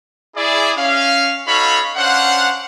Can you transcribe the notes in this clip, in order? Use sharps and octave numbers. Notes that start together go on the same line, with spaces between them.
E4 G#4 D5
C#4 F5
D#4 F#4 A4 C#5 F5 B5
C#4 D4 C5 F5 F#5